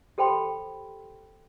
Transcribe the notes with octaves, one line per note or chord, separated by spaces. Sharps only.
G4 A4 C5 G5 B5 C6